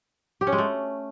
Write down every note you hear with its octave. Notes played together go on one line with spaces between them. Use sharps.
G4
C#4
G#3
A3